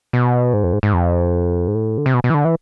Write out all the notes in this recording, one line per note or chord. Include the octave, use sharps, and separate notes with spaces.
B2
G#2
F2
G#2
G#2
F2
G#2
A2
D3
C3
B2
B2
E3
D3
E3